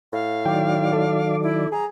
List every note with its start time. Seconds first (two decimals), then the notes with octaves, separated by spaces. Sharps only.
0.13 A2 F5
0.46 D#3 F#3 D5 G5
0.93 A4
1.43 E4
1.72 G#4 A#5